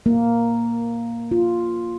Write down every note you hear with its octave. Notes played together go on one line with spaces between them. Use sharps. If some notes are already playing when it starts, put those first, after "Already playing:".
A#3
F4